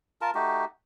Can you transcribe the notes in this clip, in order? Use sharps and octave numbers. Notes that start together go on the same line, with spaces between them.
F4 A#4 A5
A3 D#4 F#4 G4